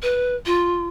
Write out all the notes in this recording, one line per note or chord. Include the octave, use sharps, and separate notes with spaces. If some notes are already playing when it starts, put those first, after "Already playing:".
B4
F4